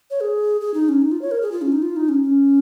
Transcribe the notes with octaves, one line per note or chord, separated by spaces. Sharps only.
C#5
G#4
G#4
D#4
C#4
D#4
F4
C#5
A#4
G#4
F4
C#4
D#4
F4
D#4
C#4
C#4